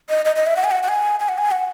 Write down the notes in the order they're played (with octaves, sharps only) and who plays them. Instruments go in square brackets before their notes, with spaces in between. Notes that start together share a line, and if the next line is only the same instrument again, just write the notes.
[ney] D#5
D#5
D#5
E5
F#5
G#5
F#5
F#5
G#5
G#5
F#5
G#5
F#5